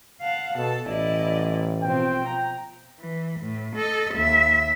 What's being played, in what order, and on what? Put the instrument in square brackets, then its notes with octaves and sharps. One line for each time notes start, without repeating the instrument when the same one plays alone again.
[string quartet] F5 F#5 A5
[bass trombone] B2 [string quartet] A4 A5
[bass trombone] A1 [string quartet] E4 D5 D#5
[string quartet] B2 F3 C4 [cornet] G5
[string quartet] A#5
[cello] E3
A2
A4 D#5
D#2 E5